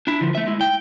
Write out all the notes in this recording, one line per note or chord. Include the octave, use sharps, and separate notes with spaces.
D4 E4
D3 F3
A3 E5
G#3 E4
G5